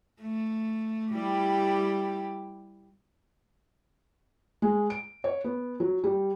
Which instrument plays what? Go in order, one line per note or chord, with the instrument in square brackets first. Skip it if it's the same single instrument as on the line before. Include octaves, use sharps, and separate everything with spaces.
[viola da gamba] A3
G3 E4 G4
[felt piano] G#3
D7
C#5
B3
F#3
G3